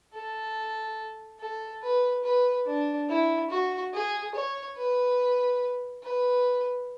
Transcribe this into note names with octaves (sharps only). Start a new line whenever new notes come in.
A4
A4
B4
B4
D4
E4
F#4
G#4
C#5
B4
B4